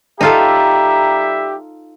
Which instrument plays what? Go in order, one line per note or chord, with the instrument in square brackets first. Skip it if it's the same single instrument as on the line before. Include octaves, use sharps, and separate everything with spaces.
[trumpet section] G3 E5 [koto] D#4 F4 A4 [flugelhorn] G4 [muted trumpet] A#5